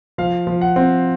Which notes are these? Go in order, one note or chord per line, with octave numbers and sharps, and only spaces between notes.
F3 F5
F3
F#5
C4